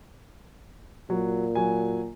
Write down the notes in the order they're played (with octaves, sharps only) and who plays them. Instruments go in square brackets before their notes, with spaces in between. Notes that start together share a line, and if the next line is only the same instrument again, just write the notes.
[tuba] A#2 [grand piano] F#3
[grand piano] F#3 G#5